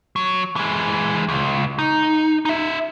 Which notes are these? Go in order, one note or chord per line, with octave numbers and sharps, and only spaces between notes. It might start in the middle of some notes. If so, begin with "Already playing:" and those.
F#3
E3 G#3
C#2
D#4
D#4 E5